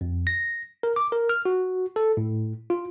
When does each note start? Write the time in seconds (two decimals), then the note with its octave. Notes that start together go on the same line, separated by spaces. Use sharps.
0.01 F2
0.27 A#6
0.83 A#4
0.96 D6
1.12 A#4
1.29 F6
1.45 F#4
1.96 A4
2.17 A2
2.70 F4